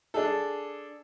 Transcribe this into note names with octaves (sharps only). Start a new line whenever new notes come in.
D4 G#4 A4